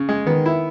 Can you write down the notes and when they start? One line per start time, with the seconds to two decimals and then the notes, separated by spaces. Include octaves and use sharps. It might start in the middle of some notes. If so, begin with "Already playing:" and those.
Already playing: C#3
0.09 G#3
0.27 D#3 B3
0.46 E4